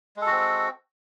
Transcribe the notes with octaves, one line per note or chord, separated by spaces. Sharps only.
G#3 C4 F#4 A4